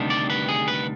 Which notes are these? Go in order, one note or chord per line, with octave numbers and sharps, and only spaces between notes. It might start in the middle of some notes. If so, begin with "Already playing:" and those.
Already playing: D2 C3 D#3 G3 D4
D5
B4
G#4
B4